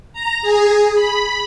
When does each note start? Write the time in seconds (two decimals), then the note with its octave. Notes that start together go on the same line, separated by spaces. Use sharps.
0.13 A#5
0.42 G#4
0.95 B5